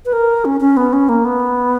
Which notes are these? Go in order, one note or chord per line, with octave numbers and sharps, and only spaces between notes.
B4
A#4
C#4
C#4
B3
C#4
A#3
B3